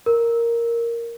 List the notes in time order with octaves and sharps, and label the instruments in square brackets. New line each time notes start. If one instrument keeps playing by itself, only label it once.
[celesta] A#4